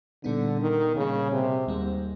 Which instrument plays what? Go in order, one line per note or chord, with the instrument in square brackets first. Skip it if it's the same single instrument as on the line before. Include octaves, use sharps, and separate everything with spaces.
[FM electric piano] A#2 G3 B3 D#4 [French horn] D3
[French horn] D#3
[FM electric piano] A#2 G3 A#3 [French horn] C#3
[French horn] C3
[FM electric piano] D#2 D#3 G3 A#3 [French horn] G#2